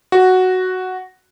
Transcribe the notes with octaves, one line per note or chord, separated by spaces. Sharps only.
F#4